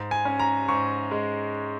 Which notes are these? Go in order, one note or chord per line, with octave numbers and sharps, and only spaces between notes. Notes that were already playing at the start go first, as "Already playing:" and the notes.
Already playing: G#2
G#5
C#4
A#5
G#2 C#6
G#3